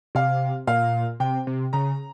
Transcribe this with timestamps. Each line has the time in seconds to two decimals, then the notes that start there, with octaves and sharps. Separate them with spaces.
0.15 C3 F5
0.67 A#2 F5
1.20 C3 G5
1.47 C3
1.73 C#3 A#5